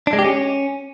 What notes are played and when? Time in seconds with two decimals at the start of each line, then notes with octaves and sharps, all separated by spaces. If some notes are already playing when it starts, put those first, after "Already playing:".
0.07 D4
0.13 G#3
0.19 G4
0.24 C#4